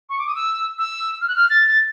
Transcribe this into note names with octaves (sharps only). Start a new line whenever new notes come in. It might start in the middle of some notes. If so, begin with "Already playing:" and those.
C#6
D6
D#6
E6
E6
F6
F#6
F6
A6
A6